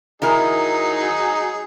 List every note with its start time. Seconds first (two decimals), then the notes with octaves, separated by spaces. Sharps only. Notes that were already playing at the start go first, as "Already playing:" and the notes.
0.22 D#3 F#3 D#4 E4 G#4 A#4